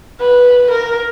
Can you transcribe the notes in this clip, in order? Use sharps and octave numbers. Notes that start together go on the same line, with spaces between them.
B4
A#4